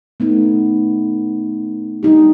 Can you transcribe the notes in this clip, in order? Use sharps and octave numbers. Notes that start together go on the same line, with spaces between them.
A3 B3 D#4
G3 D4 D#4 G4